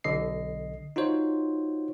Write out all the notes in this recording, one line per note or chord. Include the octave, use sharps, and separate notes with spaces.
B1 D3 D#5 C7
D#4 F4 F#4 C5 C#5